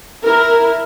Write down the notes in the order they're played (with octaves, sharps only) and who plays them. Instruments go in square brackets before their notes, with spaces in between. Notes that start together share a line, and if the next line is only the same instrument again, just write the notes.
[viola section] E4 A#4